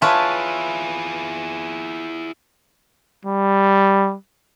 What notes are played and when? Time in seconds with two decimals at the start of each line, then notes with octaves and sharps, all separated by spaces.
0.02 E4 F4 G#4 B4 C#5 E5 A5
3.25 G3